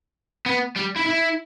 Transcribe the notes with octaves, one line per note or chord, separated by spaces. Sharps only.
B3
G3
E4
E4